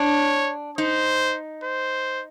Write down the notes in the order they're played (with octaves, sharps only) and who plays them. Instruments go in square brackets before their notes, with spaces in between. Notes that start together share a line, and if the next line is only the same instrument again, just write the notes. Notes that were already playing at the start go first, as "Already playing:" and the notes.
Already playing: [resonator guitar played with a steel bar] D4 [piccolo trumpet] C#5
[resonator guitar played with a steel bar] D#4 [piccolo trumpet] C5
[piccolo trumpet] C5